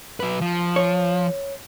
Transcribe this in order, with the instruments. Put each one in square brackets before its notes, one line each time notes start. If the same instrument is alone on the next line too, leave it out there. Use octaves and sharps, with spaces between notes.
[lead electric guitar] F#3 B4
F3
[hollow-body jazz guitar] C#5